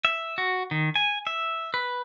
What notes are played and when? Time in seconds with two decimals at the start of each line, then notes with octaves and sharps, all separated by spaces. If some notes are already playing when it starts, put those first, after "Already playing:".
0.05 E5
0.38 F#4
0.71 D#3
0.96 G#5
1.27 E5
1.74 B4